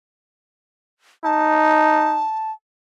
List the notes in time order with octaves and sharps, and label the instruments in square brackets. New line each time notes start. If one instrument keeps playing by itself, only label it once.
[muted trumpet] D#4 [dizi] A5